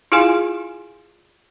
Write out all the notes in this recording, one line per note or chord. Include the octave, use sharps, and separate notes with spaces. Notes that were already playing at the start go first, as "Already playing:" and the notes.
E4 F4 G#4 F5 G#5 C6